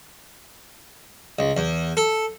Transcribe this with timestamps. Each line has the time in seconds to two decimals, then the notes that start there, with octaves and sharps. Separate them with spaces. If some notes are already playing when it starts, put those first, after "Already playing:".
1.39 C#2
1.57 E2
1.97 A4